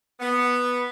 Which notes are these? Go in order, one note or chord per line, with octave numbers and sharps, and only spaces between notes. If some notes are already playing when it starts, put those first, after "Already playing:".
B3